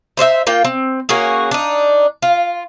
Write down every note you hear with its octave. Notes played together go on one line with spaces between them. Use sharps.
D#4 C5 D5 E5
A#3 F4 G5
C4
A#3 C#4 F#4 G#4
D4 D#4
F4